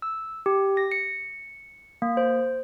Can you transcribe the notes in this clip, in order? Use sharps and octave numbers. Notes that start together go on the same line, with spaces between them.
E6
G4
A#6
C#7
A#3
C5